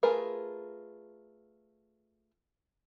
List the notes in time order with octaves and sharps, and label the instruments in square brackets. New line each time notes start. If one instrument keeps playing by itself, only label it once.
[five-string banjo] A3 F4 G#4 A#4 B4